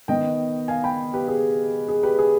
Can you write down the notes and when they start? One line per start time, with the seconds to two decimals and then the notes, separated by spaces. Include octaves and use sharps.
0.08 D#3 B3 D#5 G5
0.68 F5 G#5
0.84 G5 B5
1.14 G4 B4
1.28 G#4
1.88 G#4
2.03 G4 B4
2.19 G#4